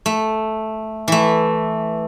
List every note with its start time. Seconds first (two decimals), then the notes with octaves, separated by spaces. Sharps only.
0.06 A3
1.08 E3 A3